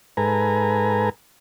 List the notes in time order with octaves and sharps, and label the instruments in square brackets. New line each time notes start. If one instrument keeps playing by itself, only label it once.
[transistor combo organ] G#2 A4 B4 G#5 A#5